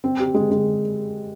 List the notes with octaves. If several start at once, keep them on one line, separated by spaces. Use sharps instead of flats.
C4
G4
G#3
G#3